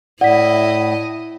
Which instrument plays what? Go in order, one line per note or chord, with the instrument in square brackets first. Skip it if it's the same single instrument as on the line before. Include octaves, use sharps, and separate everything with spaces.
[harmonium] A2 [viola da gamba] E4 D#5 [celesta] D5 B6 [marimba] F#5